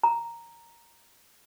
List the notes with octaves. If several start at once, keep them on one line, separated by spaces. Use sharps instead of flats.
A#5